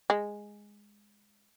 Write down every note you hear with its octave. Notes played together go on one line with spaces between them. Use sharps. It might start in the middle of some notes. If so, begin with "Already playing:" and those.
G#3